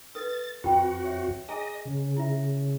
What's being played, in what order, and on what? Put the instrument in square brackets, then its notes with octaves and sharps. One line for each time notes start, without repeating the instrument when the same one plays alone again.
[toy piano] A4 B4 [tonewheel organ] A6
[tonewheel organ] F2 F#4 [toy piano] G5 B5
[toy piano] C#5 E5
[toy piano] G#4 G#5 A#5 [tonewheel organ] D#5
[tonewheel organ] C#3
[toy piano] E4 F4 E5